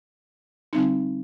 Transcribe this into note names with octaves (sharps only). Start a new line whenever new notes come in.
D3 G3 C4 D#4